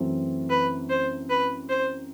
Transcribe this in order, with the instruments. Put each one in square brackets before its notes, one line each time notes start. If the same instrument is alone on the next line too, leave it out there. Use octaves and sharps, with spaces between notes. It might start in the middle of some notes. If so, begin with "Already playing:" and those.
Already playing: [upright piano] F#2 E3 A3 C4
[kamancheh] B4
C5
B4
C5